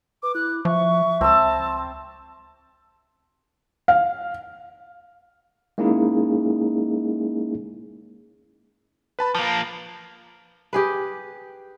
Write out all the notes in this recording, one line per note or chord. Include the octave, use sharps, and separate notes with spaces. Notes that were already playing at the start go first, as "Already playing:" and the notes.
B4 D6
E4 F#6
F3 E5 C#6
C#2 C4 A5 E6
F5
G#3 A#3 C#4 D#4 E4 G#4
B4 A5 B5
F3 A#3 A5
G4 G#4 B4